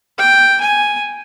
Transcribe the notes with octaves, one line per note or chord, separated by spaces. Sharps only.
G5
G#5